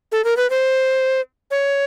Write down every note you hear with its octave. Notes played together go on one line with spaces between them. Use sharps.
A4
A#4
B4
C5
C#5